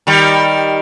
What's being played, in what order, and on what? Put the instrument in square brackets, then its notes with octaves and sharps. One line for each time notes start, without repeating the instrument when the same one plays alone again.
[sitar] D#3 G3